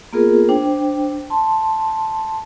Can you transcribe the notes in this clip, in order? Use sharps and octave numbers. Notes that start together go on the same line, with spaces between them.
A#3 B3 F4 G#4 A#4
D4 C5 G5
A5 C6